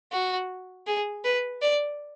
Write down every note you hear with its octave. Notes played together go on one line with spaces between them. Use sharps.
F#4
G#4
B4
D5